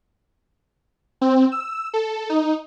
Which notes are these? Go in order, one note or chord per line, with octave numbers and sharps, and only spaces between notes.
C4
E6
A4
D#4